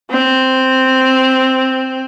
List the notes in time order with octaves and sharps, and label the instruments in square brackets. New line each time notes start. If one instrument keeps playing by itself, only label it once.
[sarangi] C4